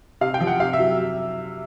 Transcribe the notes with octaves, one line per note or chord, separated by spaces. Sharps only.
C3 F5
G5
F3
F#5
C3 F5
E5
F#3